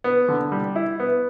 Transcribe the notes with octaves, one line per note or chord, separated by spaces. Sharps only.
B3
D3
G3
E4
B3